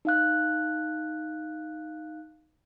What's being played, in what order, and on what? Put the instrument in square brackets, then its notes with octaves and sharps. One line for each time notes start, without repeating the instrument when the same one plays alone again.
[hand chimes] D#4 F5 F#6